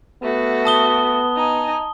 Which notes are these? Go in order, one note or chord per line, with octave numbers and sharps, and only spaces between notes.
A3 B3 F#4
A5 D#6 G7
D#4 G#5